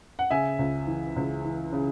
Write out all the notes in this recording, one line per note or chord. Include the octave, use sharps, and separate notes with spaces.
F#5
C#3 E5 G#5
C#2
E3
C#2
E3
C#3